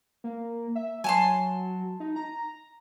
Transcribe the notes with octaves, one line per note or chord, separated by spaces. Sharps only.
A#3
E5
F#3 G#5 A5 C6
D#4
A#5